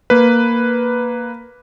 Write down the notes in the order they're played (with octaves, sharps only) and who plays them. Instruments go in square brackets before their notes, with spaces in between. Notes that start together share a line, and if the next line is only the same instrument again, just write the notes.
[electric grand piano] A#3 B4